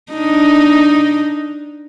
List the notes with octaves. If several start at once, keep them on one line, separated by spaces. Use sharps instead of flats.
D4 D#4